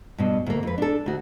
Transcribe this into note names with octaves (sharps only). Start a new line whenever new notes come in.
G2 B2
D2 A#3
F2 B4
D4 A4
D2 F#4